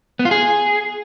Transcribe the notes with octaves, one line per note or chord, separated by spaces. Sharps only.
B3
F4
G#4